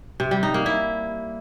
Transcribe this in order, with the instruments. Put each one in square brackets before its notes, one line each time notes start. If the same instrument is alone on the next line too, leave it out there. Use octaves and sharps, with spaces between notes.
[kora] C3
G3
D#4
A#3
E4